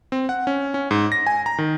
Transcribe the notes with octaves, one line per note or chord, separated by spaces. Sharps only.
C4
F#5
C#4
C#4
G#2
A#6
G#5
A#5
D#3